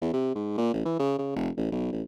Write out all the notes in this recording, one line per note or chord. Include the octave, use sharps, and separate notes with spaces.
E2
C3
G#2
A#2
A1
E3
C#3
C#3
F1
A1
B1
A1